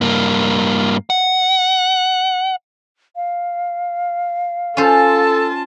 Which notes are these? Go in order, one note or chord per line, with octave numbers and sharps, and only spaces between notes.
G2 A#3
F#5
F5
C#4 F4 A4 C5 A5